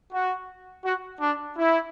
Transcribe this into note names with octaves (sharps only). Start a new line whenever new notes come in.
F#4
F#4
D4
E4